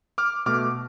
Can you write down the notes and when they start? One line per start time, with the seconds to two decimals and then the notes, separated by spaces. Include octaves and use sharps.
0.18 D6 F6
0.46 B2 A3 D6 F6